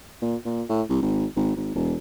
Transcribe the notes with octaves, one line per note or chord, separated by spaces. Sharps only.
A#2
A#2
A2
C2
G#1
G#1
G#1
E1